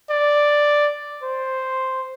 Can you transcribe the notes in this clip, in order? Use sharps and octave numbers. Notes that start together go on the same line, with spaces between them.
D5
C5